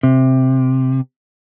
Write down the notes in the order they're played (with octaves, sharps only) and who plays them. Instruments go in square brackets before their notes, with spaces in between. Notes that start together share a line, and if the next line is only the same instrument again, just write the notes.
[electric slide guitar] C3